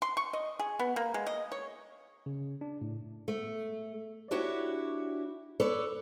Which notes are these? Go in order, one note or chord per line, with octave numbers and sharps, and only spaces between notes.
C6
C#6
D#5
G#4
B3
A#3
G#3
D#5
C#5
C#3
D4
A2
A3
D4 E4 F#4 G4 C#5
A4 B4 C#5 D5